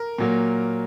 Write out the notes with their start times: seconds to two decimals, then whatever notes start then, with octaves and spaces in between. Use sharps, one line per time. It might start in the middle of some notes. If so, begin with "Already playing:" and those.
Already playing: A#4
0.18 A#2 F#3 A#3